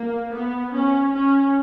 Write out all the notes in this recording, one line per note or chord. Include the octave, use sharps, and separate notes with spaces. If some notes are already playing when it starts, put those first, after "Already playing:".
Already playing: A#3
B3
C#4
C#4